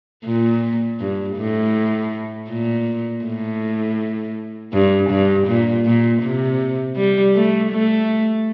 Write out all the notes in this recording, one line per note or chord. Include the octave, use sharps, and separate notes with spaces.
A#2
G2
A2
A#2
A2
G2
G2
A#2
A#2
C3
G3
A3
A3